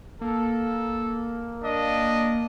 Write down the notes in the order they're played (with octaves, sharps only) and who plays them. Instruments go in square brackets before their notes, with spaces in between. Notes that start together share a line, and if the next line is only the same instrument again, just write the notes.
[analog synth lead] A#3 [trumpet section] A4
[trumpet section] D4 D#5